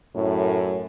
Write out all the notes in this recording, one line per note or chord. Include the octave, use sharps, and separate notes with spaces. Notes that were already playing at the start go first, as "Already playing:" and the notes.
F#2 A2